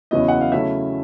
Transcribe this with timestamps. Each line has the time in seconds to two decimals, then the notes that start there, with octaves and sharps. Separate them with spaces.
0.11 E2 C#3 F#3 B3 E4 D#5
0.28 F#5
0.41 F5
0.52 C#3 F#3 A3 C#4 E4 E5